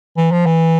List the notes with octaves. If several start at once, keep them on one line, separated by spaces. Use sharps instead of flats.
E3
F3
E3